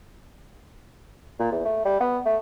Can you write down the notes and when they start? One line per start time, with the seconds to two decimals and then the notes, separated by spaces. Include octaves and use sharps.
1.39 A#2
1.52 E2
1.65 A3
1.85 G3
2.00 B3
2.25 A3